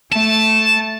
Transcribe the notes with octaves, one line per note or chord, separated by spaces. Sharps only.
A3 A5